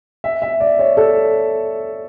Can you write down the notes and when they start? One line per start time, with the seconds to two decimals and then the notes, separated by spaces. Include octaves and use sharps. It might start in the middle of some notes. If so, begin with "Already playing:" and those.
0.24 E5
0.42 E5
0.60 D5
0.79 C#5
0.97 A4